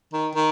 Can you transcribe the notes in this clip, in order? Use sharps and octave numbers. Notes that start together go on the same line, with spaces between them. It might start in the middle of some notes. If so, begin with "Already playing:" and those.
D#3
D#3